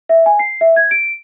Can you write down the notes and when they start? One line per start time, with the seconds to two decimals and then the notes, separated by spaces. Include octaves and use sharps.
0.09 E5
0.26 G#5
0.39 C7
0.61 E5
0.76 G#6
0.91 D7